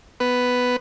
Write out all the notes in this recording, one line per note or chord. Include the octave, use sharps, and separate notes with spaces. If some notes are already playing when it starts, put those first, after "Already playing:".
B3 B4